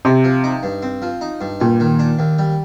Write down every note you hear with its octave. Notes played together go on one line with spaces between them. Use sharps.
C3 C4
F3
D#4
G2
C4
F3
D#4
G2
A#2 G3
D#3
D4
D#2
G3